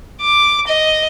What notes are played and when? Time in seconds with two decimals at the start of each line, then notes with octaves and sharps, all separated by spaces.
0.21 D6
0.67 D#5